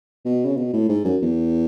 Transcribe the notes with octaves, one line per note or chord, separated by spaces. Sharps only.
B2
C#3
B2
A2
G#2
F#2
E2